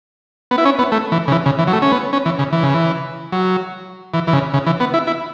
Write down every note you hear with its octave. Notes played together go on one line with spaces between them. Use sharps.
B3
E4
C#4
B3
A3
E3
C#3
E3
C#3
E3
F#3
A3
C#4
B3
C#4
E3
C#3
E3
C#3
E3
F#3
E3
E3
C#3
C#3
E3
B3
E4
E4